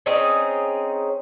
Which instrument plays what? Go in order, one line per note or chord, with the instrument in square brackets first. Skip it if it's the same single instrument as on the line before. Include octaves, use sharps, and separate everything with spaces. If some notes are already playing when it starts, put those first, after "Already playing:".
[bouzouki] C4 C#4 D#4 G#4